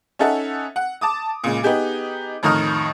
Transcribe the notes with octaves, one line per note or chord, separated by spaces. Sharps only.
C#4 D#4 A4 E5 F#5
F#5
A5 D6 D#6
A#2 C#3 G#3
B3 D#4 G4 G#4
F2 A2 D#3 A#5 D#6 F6